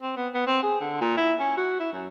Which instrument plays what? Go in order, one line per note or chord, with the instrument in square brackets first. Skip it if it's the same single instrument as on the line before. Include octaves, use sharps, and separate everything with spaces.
[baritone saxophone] C4
B3
B3
C4
G#4
D3
A#2
E4
C#4
F#4
E4
F#2